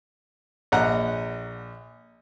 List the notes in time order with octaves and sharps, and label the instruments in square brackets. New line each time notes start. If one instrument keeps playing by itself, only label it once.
[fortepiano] A#1 D#5 F#5 A#5